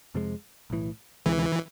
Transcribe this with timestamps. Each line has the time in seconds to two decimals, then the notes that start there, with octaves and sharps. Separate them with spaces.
0.14 F2 C3 F3 G#3
0.70 B1 A2 E3
1.26 D2 C3 E3 G#3